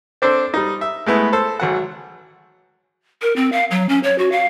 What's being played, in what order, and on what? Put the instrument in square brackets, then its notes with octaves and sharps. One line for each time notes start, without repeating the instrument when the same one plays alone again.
[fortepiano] C4 D4 A4 C5
G3 D#4
E5
G#3 A3 B3 E4
A4 C5
G#1 F#3 F#5
[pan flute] A#4
C4
F5
F#3
C#4
C#5
F#4
F5